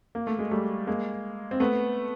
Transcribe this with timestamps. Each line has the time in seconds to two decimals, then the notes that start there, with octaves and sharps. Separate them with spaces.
0.15 A#3
0.27 A3
0.39 G#3
0.51 G3 A3
0.87 G#3 A#3
1.51 C4
1.60 A3 B3